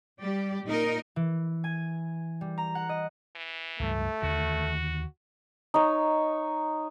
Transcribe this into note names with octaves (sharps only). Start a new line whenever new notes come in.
G3 G4 D5
A#2 D#4 A#4 D#5
E3
G#5
G3
A#5
F#5
D#5
E3
C#2 G2 A3
D#2 D3 D#3 F#4
D#4 C#5